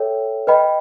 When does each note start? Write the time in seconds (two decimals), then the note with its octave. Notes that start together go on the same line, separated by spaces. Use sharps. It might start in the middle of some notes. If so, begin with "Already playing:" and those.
Already playing: A4 C#5 E5 G5
0.47 B4 D#5 G5 B5